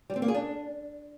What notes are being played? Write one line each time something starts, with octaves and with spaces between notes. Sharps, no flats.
G3
C4
A#3
G#4
D4